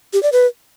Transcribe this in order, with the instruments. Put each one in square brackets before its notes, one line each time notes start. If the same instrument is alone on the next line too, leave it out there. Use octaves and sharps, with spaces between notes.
[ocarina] G4
D5
B4